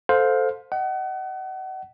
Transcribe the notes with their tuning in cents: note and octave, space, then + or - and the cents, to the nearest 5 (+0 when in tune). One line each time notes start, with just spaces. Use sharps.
A4 +0 C5 -5 F5 +25
D#5 +0 F#5 +35